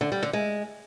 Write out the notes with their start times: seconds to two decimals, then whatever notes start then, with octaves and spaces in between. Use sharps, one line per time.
0.01 D3
0.12 G3
0.23 D3
0.33 G#3